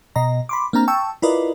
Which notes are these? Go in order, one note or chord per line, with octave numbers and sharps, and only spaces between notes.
B2 D#5 A#5
B5 C6 D6
A#3 C4 D4 A#5 F6
G5 A5 C#6 E6
E4 F4 A#4 B4 D5 D#5